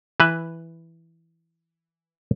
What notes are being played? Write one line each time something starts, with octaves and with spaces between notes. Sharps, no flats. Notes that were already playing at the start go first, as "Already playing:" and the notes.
E3 B4 E5